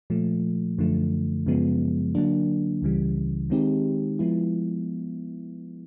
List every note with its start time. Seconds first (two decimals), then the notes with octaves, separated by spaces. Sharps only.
0.10 A#2 F3 A3
0.78 F#2 D3 F3 A3
1.46 F#2 C#3 F3 G#3 B3
2.15 D3 F#3 A#3 D4
2.82 C#2 C#3 E3 G3
3.50 D#3 G#3 C4 D#4 G4
4.19 F3 G#3 B3 E4